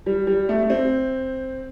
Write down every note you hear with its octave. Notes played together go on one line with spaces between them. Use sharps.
G3
G3
A3
A3
C4